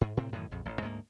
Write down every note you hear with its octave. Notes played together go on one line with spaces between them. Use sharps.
G#2
A2 C3 C4
F#2 A2 D#3 E3
A#1 F2
A1
D2 G#2 F3 A#3